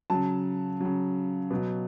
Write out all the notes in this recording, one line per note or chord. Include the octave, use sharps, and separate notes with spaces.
C#3 F#3 A5
C#3 F#3
B2 F#3